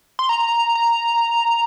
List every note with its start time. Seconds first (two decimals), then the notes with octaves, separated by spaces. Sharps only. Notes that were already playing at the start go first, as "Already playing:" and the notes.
0.19 C6
0.29 A#5
0.75 A#5